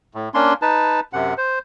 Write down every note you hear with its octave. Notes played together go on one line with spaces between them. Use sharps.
A2
A#3 C#4 D4 C6
D#4 B4 A5
F#2 C3 F#5
C5